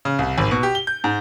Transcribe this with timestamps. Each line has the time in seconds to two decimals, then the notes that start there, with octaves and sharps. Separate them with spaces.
0.05 C#3
0.19 C2
0.38 G#1
0.51 B2
0.63 G4
0.75 G7
0.87 G6
1.04 G#2